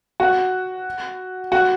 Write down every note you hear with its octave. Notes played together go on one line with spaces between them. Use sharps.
F#4
F#4